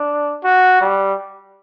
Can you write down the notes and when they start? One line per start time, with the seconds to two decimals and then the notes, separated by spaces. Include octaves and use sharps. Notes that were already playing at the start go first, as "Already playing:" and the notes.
Already playing: D4
0.44 F#4
0.81 G3